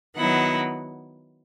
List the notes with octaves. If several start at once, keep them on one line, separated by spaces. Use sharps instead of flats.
D#3 F#3 B3 E4 F#5